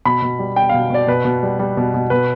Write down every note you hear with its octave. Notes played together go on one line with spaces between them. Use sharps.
B2 B5
B2
G3
G3 G5
B2 F5
B2 D5
B2 B4
B2
G3
G3
B2
B2
B2 B4